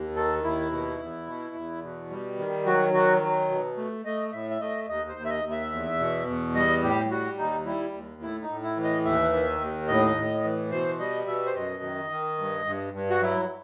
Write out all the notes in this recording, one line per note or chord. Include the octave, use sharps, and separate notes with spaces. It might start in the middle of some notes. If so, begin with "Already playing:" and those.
Already playing: D#2
D#3 A4
D#2 E4
B2
E2
B2
E2
B2
G3
D#3
F#3 F#4
D#3 F#4
F#3
B2
A3
A3 D#5
A2 E5
E5
A3 D#5
D#2 D#5
C5
D#2
E5
D#5
D#2
E5
E2
B2
E2
G3 D#5
A2 G4
G3 F#4
D#2 D#4
G3 E4
D#2
A2 E4
D#4
A2
E4
E3
D#5
D#2 E5
D#3
D#2
A2 D#5
A2
E3
B2 C5
G3 D#5
B2 E5
C5
F#2 D#5
D#3
D#3
G2
G2
G2
F#4
F#3 E4